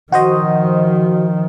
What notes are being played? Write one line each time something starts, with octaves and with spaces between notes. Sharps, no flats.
D#3 F3 F#4 C5 D#5